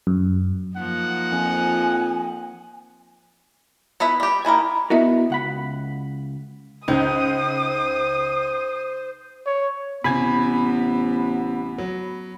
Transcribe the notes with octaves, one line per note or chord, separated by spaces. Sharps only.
F#2
F3 A#3 D#4 F#5
F2 G#5
B3 E4 B4 E5
G3 G4
D#3 A#3 E4 G#5
B3 E4 F#4 A#4 D#5 E5
C#2 F#5 B5
C#2 D#4 C5 D#6 G6
C#5
A1 C3 B3 G#5 B5 G#6
F#3